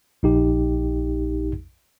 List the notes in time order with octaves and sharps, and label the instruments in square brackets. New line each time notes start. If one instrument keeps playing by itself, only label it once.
[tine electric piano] A#1 D#4 G4